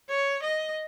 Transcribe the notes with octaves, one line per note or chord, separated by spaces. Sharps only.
C#5
D#5